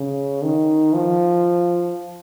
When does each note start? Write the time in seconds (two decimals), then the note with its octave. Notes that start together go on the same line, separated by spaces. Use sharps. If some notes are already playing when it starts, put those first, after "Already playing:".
Already playing: C#3
0.42 D#3
0.94 F3